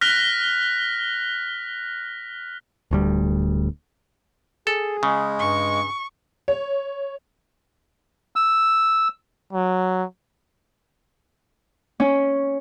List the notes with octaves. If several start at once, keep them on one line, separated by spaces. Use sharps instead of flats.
F6 F#6 A#6 B6 F7 G7
D1 D2 G3
G#4 A4
C#3 G#3
G2 C#6
C#5
E6
F#3
C#4